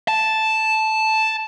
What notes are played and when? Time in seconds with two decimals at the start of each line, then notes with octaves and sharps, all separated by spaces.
0.08 A5